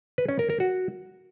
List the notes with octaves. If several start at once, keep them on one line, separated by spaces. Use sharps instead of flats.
B4
C#4
A#4
A#4
F#4